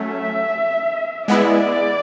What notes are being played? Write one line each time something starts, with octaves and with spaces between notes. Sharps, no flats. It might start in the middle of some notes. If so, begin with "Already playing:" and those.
Already playing: F#3 A3 C#4 E5
G#3 B3 E4 D5